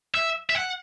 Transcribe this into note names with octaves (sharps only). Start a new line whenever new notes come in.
E5
E5
F#5